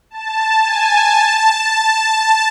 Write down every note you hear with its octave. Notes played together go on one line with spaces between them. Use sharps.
A5
G#5
A5
A5